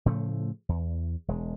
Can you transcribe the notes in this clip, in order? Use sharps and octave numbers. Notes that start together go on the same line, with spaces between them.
A2 C#3 F3 A3
E2
E1 G#3